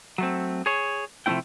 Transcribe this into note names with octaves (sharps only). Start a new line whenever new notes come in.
F#3 A3 C4
G#4 C#5
C3 F3 A3 C4 E4 G5